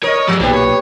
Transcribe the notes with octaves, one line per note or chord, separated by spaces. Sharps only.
A#4 C#5 D#5 D#6
G#2 F3
B1 A#2 G4 A4 B4 C5
C#5